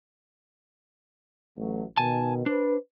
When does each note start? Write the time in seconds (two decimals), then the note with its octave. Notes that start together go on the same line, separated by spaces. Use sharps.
1.57 A1 F#3 A3
1.97 B2 D#3 G#5 A5
2.46 D4 B4 C5